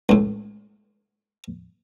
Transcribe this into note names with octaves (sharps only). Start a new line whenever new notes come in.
C#2 A2